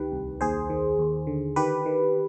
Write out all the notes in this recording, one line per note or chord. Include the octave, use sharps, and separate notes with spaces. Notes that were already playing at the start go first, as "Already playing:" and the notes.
Already playing: D2 D#3 G4 B4
C2
D#2 G#4 C5
D#3
D#2
D3
D#3 G4 B4
D#3